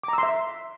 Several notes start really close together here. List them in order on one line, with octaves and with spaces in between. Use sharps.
D6 A#5 E6 C6 E5